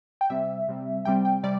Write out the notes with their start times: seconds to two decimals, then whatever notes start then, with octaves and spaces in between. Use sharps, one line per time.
0.21 G5
0.30 C3 G3 C4 E5
0.68 C3 G3 C4
1.05 C3 G3 C4 G5
1.25 G5
1.43 C3 G3 D5